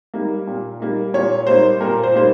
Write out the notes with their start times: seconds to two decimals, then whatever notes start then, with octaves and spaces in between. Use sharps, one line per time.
0.14 G3 A#3 D#4
0.48 A#2
0.80 G3 A#3 D#4
1.14 A#2 C#5
1.47 G3 A#3 D#4 C5
1.81 A#2 A#4
2.03 C5
2.14 G3 A#3 D#4 C5